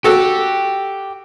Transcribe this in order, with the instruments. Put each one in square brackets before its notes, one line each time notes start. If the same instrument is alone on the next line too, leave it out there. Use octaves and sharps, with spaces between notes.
[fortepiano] F#4 A4 [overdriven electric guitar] G4